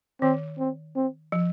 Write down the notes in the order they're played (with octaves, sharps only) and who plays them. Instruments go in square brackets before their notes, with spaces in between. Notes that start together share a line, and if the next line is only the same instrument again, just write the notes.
[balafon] D#3 [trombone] C4
[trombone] C4
C4
[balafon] F3